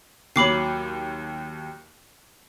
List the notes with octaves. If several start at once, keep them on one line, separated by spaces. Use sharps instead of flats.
D#2 F#3 B5 D6 C7